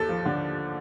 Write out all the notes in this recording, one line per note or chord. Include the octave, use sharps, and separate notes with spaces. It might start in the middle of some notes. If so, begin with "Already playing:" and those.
Already playing: D#2 A4
F3
D3